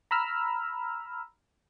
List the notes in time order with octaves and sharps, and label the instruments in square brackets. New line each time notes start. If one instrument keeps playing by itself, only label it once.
[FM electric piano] A#5 B5 E6 F6